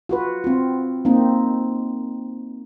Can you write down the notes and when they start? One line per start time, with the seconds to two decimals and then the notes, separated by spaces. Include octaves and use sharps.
0.09 F4 F#4 B4
0.44 C4 F4
1.05 A#3 C4 D#4